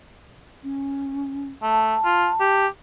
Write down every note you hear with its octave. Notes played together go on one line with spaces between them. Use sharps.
C#4
A3 A5
F4
G4